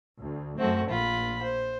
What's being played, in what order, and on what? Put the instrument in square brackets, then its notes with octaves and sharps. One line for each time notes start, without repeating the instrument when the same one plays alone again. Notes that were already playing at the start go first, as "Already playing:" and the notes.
[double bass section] D2
[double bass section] F#2 A3 [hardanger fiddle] C4 F#4
[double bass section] A#1 [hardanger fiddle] F4 B5
[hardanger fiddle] C5